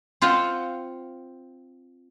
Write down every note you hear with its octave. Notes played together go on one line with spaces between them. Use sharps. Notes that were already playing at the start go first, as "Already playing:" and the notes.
C4 F4 C5 D#5 F5 F#5